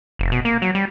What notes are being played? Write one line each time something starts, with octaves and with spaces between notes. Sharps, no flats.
F1
B2
A#3
F#3
G3